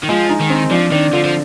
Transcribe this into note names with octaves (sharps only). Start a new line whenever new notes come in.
D#3
F3 G#3
D#4
D#3
C4
F3 D4
D#3 D4
D3 F3
F3